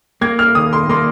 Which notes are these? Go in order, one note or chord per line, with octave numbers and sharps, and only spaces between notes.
A#3 G#6
F6
D#2 D#6
C6
A#3 C6